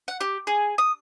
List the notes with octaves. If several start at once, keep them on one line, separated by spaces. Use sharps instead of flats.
F#5
G4
G#4
D#6